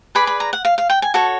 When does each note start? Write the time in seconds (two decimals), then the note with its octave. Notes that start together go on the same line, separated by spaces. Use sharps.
0.15 G#4 B4 D5 B5
0.27 B5
0.40 A#5
0.53 F#5
0.65 F5
0.78 F5
0.90 G5
1.02 G#5
1.14 F#4 A4 C#5 A5